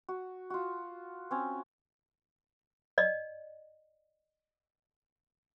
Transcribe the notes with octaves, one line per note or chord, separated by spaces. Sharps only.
F#4
F4 F#4
C4 C#4
D5 D#5